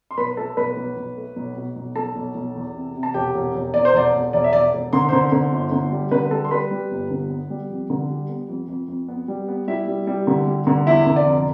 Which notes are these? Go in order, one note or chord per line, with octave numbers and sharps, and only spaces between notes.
C6
B1 B4 B5
A3 A4 A5
B1 B4 B5
B1
B1
A3
B1
B2
B1
B1 A4 A5
B1
B1
E2
C3
C3
A5
E1 G4 G5
E1
E1
E2 D5
C5
E1 D5
E1
E1 D5
E5
E1 D5
E1
D3 C6
D3 C5 C6
D3
G1
D3
G3
D3 B4 B5
G3 A4 A5
C6
G3 B4 B5
G3
G1
D3
B3
G3
F2
D3
G3
B3
F2
F2
F2
B3
G3
B3
G3 E4 E5
G3
G3
D3
G3
D3
E2 E4 E5
D3
D5
F1